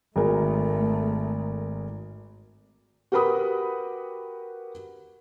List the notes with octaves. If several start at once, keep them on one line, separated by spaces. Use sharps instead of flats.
G#1 A3 G#4 A#4
F#4 G4 A#4 B4 B5 D#6